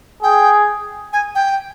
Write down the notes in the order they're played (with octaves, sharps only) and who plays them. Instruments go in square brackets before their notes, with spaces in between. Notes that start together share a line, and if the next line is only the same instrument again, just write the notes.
[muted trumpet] G#4 [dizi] G5
[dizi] G#5
G5